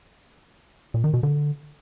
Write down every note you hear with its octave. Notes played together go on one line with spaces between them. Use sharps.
A#2
D#3
B2
D3